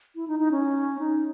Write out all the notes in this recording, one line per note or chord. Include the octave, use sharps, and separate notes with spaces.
E4
D#4
D#4
C#4
D#4